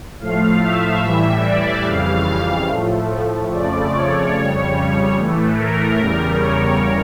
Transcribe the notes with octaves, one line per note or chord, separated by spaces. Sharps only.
A2 F3 A3 F5
E5
A2 E3 G3
D5
F2 C#3 E3 G3 F5
A2 F3 A3
F2 C#3 F3 A3 D5
C#5
F2 C#3 G3
A2 E3 A3
A#4
E2 C#3 G3 A#4
C#5